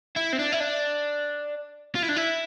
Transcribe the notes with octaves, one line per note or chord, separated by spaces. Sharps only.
E4
C4
D4
E4
D4
F4
E4
D4
E4